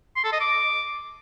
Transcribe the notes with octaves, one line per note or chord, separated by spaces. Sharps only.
C6
A4
D#5
D6